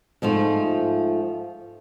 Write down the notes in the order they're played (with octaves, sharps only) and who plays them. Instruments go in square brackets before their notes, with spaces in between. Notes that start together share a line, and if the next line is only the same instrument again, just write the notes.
[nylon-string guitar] G#2 F3 A3 F4